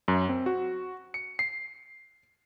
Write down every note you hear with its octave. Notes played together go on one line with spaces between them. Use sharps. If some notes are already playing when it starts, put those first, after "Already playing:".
F#2
C4
F#4
C#7
C7